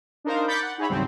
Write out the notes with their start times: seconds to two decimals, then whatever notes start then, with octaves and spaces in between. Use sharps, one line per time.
0.24 D4 D#4 A#4 C5 F5
0.47 B5 D6 G6 A6 B6 C#7
0.62 F#5
0.78 D#4 G#4 C#5 E5 B5
0.89 D#2 G#2 C#3 F#3 G3 C4